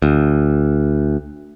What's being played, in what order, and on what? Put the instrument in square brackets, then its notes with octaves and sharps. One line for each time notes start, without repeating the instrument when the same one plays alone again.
[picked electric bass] D2